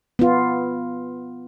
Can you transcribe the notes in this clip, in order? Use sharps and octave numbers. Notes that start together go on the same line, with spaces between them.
B3 F4